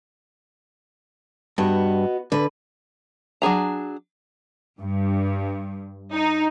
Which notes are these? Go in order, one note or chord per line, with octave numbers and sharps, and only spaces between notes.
G2 B3 F#4 D#5
D3 B4
F#3 D4 G#4 A#5
G2
D#4